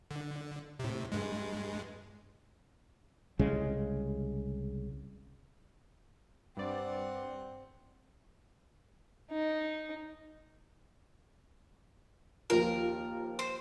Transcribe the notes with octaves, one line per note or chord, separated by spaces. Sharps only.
D3
A2 C3
G2 G#3
C2 C#3 G#3
G2 C4 D5 F#5
D#4
D#2 F3 F4 A#4
C5